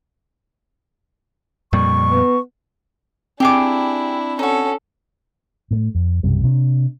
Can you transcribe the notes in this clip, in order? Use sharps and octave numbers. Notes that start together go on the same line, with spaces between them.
F2 A#2 G3 C#6
B3
C4 D4 E4 G4 G#4 D6
C#4 D#4 F#4 A4
A2 A3
F2
B1 F#2 C3 G3
C3 C#4 D4